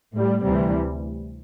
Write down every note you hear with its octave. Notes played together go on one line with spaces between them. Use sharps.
A2 G3
D2 C3 E3 G3